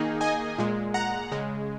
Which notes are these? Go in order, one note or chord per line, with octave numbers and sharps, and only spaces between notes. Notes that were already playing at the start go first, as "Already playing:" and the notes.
Already playing: D#3 A#3 D#4 G#4
D#5 G#5
A#2 G#3
F#5 A#5
C#3 G#3